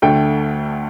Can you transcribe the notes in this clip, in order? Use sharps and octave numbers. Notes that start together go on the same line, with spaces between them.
D2 D3 A3 G5